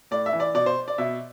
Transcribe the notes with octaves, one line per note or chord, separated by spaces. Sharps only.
A2 D5
E5
E3
D5
B2 D5
C5
D5
B2 E5